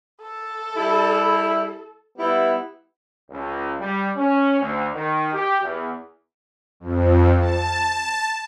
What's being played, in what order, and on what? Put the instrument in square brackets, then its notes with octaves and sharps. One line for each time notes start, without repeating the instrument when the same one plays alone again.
[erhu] A4
[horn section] G3 E4
G3 B3 E4
[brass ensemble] C#2
G3
C#4
D2
D#3
G4
E2
[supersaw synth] F2
A5